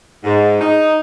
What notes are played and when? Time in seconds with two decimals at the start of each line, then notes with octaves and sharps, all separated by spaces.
0.24 G#2
0.61 D#4